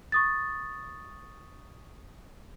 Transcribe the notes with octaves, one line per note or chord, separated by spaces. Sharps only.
C#6 D#6 A6